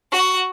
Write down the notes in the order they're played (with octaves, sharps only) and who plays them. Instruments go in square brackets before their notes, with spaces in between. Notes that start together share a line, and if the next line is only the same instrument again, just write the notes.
[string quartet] F#4